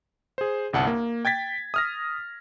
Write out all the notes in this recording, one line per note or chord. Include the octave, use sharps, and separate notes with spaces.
G#4 C5
G1 C2 F#5 A5
A#3
G5 G#6 A6 B6
D#6 F6 A#6